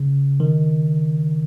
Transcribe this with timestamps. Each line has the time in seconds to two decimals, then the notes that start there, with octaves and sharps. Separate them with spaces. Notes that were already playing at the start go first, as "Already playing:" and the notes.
Already playing: C#3
0.40 D#3